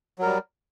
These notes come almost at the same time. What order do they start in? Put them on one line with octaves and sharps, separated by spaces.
F#3 A#4 G3